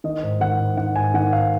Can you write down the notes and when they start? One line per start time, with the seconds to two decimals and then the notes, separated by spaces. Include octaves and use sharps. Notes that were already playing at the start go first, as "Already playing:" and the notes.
0.04 D#3 D#5
0.23 G#2
0.41 D#3 F#5
0.59 G#2
0.77 D#3 F#5
0.96 G#2 G#5
1.14 D#3 F#5
1.33 G#2 F5